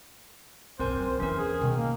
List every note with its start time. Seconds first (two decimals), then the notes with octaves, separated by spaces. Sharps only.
0.79 B1 F#2 C4 A#4 C5 G#5
0.95 F#2 F#3 C5
1.20 E2 E3 C#4 D4 A#4
1.39 G#4
1.61 B2 D#3 G#3
1.77 A#3